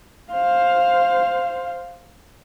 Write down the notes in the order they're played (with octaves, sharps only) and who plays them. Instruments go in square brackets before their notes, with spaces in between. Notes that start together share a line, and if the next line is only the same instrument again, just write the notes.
[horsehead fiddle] C5 F5